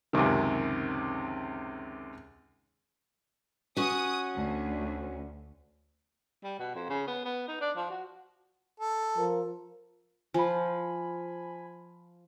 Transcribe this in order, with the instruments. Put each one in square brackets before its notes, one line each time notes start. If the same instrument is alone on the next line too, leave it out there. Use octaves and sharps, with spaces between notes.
[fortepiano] C#2 F#2 C3 D#3
[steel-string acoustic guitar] C#4 F#4 [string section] D#6
[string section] D2
[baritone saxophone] G3
B2
F2
C#3
B3
B3
D#4
D4
F3
F#4
[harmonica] A4
[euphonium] F3 [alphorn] A#4
[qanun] F3 [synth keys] G#5 B5